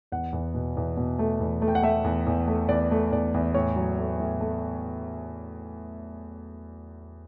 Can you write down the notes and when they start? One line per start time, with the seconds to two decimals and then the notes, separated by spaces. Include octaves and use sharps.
0.12 E2 F#5
0.33 E2
0.54 B2
0.77 E2
0.97 B2
1.19 A3
1.40 E2
1.62 A3
1.68 G5
1.75 F#5
1.83 A3 E5
2.04 E2
2.26 E2
2.48 A3
2.69 E2 D5
2.91 A3
3.12 E2 D5
3.34 E2
3.54 A2 C#5
3.76 F#3
3.98 A3
4.20 A2
4.41 A3